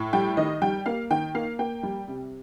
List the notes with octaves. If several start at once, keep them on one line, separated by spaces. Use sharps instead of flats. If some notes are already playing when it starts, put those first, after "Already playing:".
Already playing: A2
G3 G5
D#3 D#5
G3 G5
A#3 F5
D#3 G5
A#3 F5
A#3 G5
G3
C3